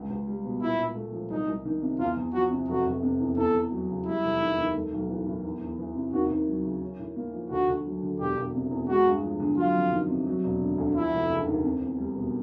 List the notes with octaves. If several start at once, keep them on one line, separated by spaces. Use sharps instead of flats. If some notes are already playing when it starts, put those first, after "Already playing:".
Already playing: C#2
C#2
G3
B2
A#2 E4
A#2
A3
F3
C2 D#4
C2
D#3
C3
E2 F4
E2
F3 F#4
C3
F1 F#4
F1
C3
E2
E2 A4
E2
F#3
C#3
G3 E4
F1
D#3
D#2
A3
B1
E3
A2
E2
E2
E3
C3
D#2 F#4
D#2
F#3
C#3
C#4
A2
A#3
F3
D2 F#4
D2
F#3
D3
E1 G4
E1
C3
E2
G#3 F#4
G2
F3
D3
F#3 F4
F2
D#3
C3
F#3
E1
D3
D2
F3 E4
F1
C#3
D#2
C4
E2
G3
B2